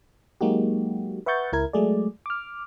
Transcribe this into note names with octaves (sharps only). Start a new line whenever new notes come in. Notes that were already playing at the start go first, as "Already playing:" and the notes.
F#3 G#3 A#3 D#4 F#4 G4
B4 E5 F#5 C#6 G6 A6
C#2 E4 A#4 G#6
F#3 G#3 A3 G#4 D5
D6 F6